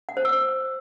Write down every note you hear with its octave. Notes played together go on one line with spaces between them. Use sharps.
F#5
C5
E6